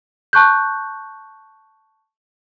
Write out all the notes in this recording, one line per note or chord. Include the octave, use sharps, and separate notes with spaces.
A5 C#6 F#6 G6